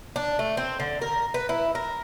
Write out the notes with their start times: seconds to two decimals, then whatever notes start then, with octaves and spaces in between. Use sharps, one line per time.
0.16 D4
0.39 A3
0.57 C4
0.80 D3
1.02 A#4
1.34 B4
1.49 E4
1.75 A#4